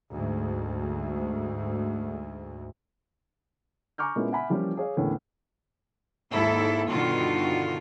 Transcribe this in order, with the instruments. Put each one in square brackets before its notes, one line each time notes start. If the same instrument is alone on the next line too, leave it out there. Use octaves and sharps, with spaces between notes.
[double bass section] D2 G#2
[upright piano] G#5 A#5 C#6 D6 F6 G6
A#2 G#3 A#3 B3 C#4 E4
E5 F#5 G#5 B5
E3 F3 G3 A#3 C#4 F4
G#4 C#5 F5
E2 A2 D3 A#3 C#4
[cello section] D#2 G#2 E4 A4
G2 B2 D3 D#3 F4 F#4